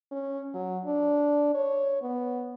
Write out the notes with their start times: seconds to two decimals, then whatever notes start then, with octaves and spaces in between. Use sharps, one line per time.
0.11 C#4
0.54 F#3
0.85 D4
1.54 C#5
2.02 B3